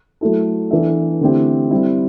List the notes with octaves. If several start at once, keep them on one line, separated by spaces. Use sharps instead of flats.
F#3 A3 E4 A4
E3 B3 D4 A4 E5
D3 A3 C4 E4 G4
G3 C4 E4